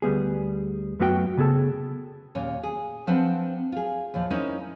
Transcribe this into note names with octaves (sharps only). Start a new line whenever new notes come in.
D2 G3 B3 G#4
F#2 A3 B3 F#4 A#4 G5
C#3 B3 G#4 A4 A5
D#2 A#2 C#4
G#4
F3 C4 D4 B4 F#5
F4 G#4
D#2 A#2 F3
G#3 C#4 D#4 E4 A#4 C5